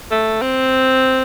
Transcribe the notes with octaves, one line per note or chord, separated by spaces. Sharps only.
A3
C4